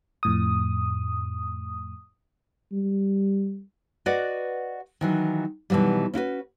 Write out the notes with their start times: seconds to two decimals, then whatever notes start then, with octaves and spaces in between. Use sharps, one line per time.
0.23 F2 A2 D#6
2.72 G3
4.06 F#4 B4 D5 D#5 F#5
5.01 D#3 E3 F#3
5.70 B2 D#3 E3 F#3 G3
6.14 C#4 E4 F#4 B4